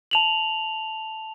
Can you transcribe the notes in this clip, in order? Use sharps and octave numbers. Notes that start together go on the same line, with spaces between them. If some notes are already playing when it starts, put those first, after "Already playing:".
A5 F7 F#7